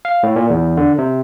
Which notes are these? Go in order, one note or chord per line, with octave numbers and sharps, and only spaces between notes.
F5
A2
A#2
E2
D3
C3